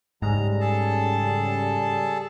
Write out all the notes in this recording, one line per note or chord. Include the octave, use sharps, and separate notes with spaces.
G#2 C#3 G3 A#5
G#4 A4 A5